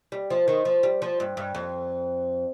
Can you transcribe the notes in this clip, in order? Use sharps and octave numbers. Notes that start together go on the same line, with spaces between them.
G3
F3
D#3
F3
G3
F3
G2
G2
F2